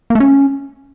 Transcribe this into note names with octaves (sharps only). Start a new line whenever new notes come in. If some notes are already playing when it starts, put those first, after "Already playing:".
A#3
A3
C#4